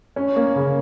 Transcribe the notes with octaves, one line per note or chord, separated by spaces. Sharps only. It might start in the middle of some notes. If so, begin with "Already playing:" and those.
C#4
A#3
C#3